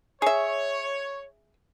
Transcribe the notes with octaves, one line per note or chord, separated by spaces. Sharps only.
G#4 C#5 E5